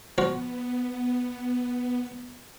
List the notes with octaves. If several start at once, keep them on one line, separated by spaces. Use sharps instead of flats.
F3 B3 F4 F#4